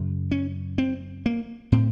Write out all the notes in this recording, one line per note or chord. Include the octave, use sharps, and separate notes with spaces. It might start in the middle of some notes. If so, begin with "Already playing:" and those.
Already playing: F#2 C#3
C#4
C4
A#3
A2 C4